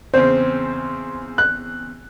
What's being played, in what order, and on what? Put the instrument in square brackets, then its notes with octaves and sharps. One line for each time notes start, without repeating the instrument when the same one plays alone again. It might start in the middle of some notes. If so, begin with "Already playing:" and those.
[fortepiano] E2 C#3 C4 [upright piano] C5
[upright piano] F#6